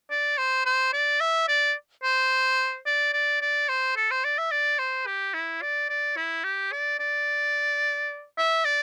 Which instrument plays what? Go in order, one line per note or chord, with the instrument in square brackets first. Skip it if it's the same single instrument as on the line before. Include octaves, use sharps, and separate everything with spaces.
[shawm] D5
C5
C5
D5
E5
D5
C5
D5
D5
D5
C5
A4
C5
D5
E5
D5
C5
G4
E4
D5
D5
E4
G4
D5
D5
E5
D5